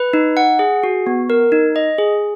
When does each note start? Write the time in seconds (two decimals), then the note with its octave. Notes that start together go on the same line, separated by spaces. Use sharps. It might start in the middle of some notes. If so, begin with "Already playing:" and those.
Already playing: B4
0.13 D#4
0.37 F#5
0.59 G#4
0.83 F#4
1.07 B3
1.30 A#4
1.52 D#4
1.76 D#5
1.98 G#4